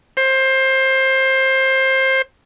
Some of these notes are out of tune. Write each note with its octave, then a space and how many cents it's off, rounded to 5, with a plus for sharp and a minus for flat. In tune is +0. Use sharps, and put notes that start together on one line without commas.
C5 +20